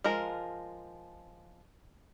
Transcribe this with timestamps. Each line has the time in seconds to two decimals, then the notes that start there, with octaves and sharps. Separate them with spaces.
0.04 F3 G#3 A#4